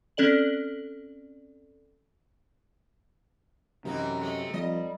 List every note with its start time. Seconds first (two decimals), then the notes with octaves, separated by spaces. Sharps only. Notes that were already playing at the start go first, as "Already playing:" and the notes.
0.17 C4 C#4 A4 D5 F#7
3.85 F#2 C3 E3 A#3 D#4
4.21 G#3 A3
4.54 F2 G3 D#5